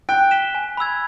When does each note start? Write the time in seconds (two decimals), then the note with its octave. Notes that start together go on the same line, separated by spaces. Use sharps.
0.09 G5 F#6
0.31 B6 E7 G7
0.55 G#5
0.77 B5 E6 G#6